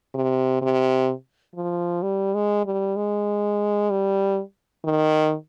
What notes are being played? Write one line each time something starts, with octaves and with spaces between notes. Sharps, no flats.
C3
C3
F3
G3
G#3
G3
G#3
G3
D#3